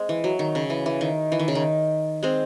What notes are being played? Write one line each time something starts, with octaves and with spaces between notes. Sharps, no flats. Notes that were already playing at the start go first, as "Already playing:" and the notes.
Already playing: G#3 C4
E3
F#3
D#3
C#3
E3
E3
D#3
E3
D#3
C#3
D#3
G#3 C4